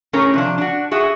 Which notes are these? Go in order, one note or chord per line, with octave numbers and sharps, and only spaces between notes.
A2 C#4 G#4 A#4 C#5
C3 F3 D4
D4 F#4
F#4 G#4 E5